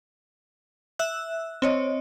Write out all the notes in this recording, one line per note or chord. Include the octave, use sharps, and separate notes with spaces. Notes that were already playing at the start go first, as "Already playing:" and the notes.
E5 E6 F#6
C4 C#5 D#5